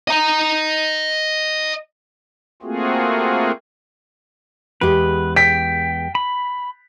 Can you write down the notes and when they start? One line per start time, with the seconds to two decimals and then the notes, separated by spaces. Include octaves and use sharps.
0.08 D#5 A#5
2.63 A3 A#3 C4 F4 F#4 G#4
4.81 E2 G#3 G4 B4
5.36 G5 B6
6.15 B5